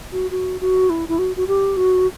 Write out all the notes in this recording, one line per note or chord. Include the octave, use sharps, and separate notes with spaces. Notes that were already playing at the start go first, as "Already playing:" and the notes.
F#4
F#4
F#4
E4
E4
F#4
F#4
G4
F#4